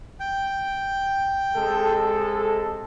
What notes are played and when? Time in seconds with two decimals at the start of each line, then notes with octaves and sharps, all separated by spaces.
0.20 G5
1.55 C3 G#3 A4